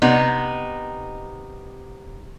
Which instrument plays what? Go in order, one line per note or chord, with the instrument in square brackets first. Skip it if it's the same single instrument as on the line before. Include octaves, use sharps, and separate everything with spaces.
[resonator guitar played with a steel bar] C3 B3 D#4